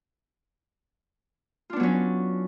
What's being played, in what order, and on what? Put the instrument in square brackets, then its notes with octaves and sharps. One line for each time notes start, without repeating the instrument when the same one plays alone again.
[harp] F4
D4
B3
F#3
C#4